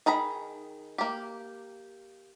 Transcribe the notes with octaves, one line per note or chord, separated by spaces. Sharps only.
D#3 G#4 A#5 B5
A#3 G4